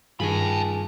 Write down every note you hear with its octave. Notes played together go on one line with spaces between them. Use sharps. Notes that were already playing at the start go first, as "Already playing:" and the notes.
G2 D#3 G3 F4 G#4 A5 B5